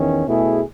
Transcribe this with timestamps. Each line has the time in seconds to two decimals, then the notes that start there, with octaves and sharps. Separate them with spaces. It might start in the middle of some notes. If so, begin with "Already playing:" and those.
Already playing: E2 D#3 C#4
0.26 B2 A3 E4 G#4